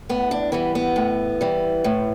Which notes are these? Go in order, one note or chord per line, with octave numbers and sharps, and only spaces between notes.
A2 B3
D4
E3 G3 B3
B3
A2
E3 G3
A2